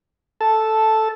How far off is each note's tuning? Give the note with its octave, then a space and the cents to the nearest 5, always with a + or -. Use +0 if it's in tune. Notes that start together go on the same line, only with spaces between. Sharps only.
A4 +0 A5 -5